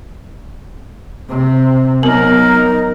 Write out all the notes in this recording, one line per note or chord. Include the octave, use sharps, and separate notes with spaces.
C3 C4
F#3 B3 D#4 A#4